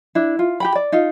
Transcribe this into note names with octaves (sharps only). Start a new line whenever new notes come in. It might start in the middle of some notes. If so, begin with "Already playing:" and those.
D4 E4
F4
G4 G5 B5
D5
D#4 F4 F5